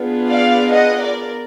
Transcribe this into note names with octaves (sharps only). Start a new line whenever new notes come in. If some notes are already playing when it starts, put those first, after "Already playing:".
Already playing: B3 D4 F4 G#4
D5 F5
D#5 F#5
A#4 D5